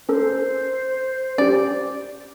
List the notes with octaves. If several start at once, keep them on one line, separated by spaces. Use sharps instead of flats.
C#4 A4 A#4 C5
C#4 G4 D5